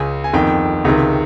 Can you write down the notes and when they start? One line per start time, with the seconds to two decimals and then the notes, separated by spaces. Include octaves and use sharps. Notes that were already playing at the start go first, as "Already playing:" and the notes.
Already playing: C#2 C#3 G#5
0.24 G#5
0.33 G1 F2 D#3 G5
0.85 C#2 C3 D#3